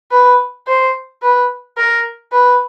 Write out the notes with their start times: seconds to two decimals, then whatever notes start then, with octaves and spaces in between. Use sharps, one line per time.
0.11 B4
0.67 C5
1.22 B4
1.77 A#4
2.32 B4